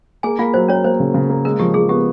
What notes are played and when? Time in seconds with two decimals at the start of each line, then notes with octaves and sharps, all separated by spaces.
0.23 A#3 G#4 G#5
0.39 A#3 F4 F5
0.54 F#3 C5
0.68 A#3 C#4 C#5
0.84 A#3 C5
1.00 C#3
1.14 C#3
1.29 A#3
1.45 G#3 A#4
1.60 F3 G4
1.74 F3 G#4
1.89 B3 G4